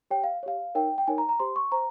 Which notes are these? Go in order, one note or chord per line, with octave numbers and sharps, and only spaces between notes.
G4 C#5 G5
F5
G4 C#5 F5
D#4 A#4 C#5 G5
G5
D#4 A#4 C#5 G#5
A#5
A#5
G4 C5 C6
C#6
C5 A#5